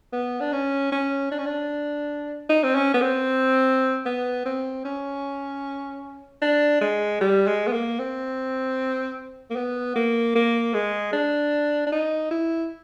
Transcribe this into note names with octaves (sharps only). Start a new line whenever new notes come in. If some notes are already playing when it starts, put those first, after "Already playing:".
B3
D4
C#4
C#4
D4
C#4
D4
D#4
C4
C#4
B3
C4
B3
C4
C#4
D4
G#3
G3
G#3
B3
A#3
C4
A#3
B3
A#3
A#3
G#3
D4
D4
D#4
E4